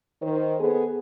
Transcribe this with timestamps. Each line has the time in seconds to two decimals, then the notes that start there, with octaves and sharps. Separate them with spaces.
0.22 D#3 C5
0.59 B3 G#4 A4